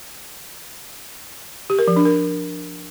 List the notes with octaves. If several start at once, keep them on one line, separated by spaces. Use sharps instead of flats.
G4
A#4
F3
D4
A#4